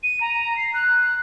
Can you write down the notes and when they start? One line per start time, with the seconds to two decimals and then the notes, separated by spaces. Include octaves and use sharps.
0.03 D#7
0.21 A#5
0.57 C7
0.74 F#6